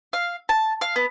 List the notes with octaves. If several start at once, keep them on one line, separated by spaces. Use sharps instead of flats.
F5
A5
F5
B3